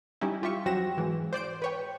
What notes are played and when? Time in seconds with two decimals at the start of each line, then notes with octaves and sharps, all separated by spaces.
0.21 G3 C#4 D#4 E4
0.43 F4 G4 E5 C#6
0.65 F2 F#3 C4 F#4 A#6 E7
0.98 G#2 E3
1.33 C5 D5 G6 D7
1.62 B4 C#5 G5